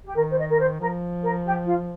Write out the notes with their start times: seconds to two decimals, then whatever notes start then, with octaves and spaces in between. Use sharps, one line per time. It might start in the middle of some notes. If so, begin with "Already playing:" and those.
0.06 G4
0.15 D#3 A#4
0.29 C5
0.37 D#5
0.49 A#4
0.58 C5
0.79 F3 A#4
1.22 A#4
1.45 G4
1.66 F4